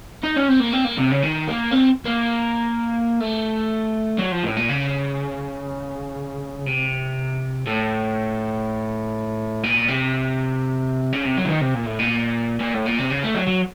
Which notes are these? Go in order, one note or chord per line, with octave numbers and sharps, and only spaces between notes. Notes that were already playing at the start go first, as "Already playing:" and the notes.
D#4
C#4
C4
A#3
C4
A#3
C3
C#3
D#3
A#3
C4
A#3
A3
F#3
F3
A2
A#2
C#3
C3
A2
A#2
C3
C#3
C3
F#3
C#3
D#3
C3
A#2
A2
A#2
A#2
A2
A#2
C3
C#3
A3
F#3
F#3